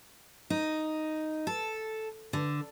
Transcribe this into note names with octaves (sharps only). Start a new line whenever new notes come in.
D#4
A4
D3